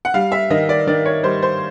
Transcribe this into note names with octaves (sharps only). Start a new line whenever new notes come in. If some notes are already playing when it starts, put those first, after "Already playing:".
F#5
G3 F5
E5
D#3 D#5
D5
D#3 D5
C#5
G3 C5
C5